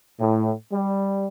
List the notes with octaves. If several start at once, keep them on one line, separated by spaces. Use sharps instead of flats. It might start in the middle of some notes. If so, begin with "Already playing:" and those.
A2
G3